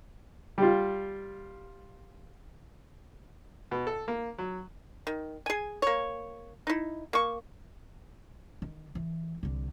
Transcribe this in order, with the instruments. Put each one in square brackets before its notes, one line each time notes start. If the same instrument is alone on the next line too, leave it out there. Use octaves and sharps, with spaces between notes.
[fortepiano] G3 F4
B2
A4
A#3
F#3
[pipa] D#3
G#4 G#5
A#3 C#5
D#4 E4
A#3 C#6
[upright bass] D#3
E3
C2 D3